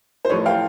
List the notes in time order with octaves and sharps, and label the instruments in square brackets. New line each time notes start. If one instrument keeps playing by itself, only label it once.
[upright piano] C5
A1 A2 F3 B4 C#5
F5 G5